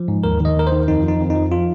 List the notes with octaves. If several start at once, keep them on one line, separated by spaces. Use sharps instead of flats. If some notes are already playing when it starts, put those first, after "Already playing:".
Already playing: F3
G#2
D#2 A#4
D#3 D#5
D#2 A#4
D#3 C5
F2 D#4
F3
D#4
F2
D#4
F3
F4